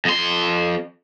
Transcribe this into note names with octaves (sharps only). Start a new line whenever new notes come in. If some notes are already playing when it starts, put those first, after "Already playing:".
F2 C6